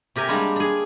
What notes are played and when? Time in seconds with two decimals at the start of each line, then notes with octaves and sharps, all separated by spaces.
0.16 C3 G4 A#4 G#5
0.28 G3 G#3 A#3 D4
0.56 D4 G#4